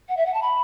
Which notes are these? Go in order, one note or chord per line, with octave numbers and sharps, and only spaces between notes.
F#5
E5
F#5
A5
B5